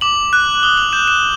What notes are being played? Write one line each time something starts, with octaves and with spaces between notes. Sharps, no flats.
D6 F#7
F#6
D#6 G7
F#7
G6 E7
E7